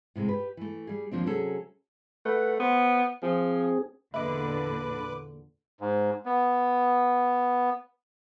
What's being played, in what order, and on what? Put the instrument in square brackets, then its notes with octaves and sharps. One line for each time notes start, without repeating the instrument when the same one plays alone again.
[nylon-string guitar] A2 C3 G#3
G4 B4
E3 A3
G3 G#4
D#2 F3 C4 D4
C3 F#3 C#4 G#4 A4
[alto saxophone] A3 [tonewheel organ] B4 F#5
[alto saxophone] B3 [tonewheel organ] C5
[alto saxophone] F3 [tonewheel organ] C4 G#4
[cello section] E2 A#2 D3 [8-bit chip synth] B4 D6 [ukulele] D#5 E5
[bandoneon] G#2
B3